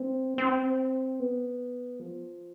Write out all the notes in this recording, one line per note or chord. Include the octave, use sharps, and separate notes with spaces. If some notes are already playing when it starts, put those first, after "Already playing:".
Already playing: C4
C4
B3
F3